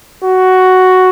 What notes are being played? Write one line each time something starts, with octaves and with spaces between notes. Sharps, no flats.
F#4